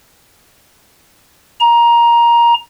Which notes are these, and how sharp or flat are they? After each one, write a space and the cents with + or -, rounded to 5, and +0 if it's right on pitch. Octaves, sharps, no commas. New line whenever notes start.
A#5 +15